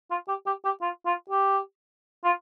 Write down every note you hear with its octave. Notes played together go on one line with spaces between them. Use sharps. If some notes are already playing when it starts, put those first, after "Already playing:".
F4
G4
G4
G4
F4
F4
G4
F4